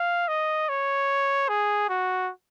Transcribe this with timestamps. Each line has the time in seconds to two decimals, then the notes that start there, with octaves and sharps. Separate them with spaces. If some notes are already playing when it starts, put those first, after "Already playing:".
Already playing: F5
0.28 D#5
0.69 C#5
1.49 G#4
1.89 F#4